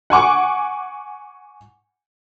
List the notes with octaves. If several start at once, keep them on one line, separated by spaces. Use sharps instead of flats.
F#5 G#5 C#6 D6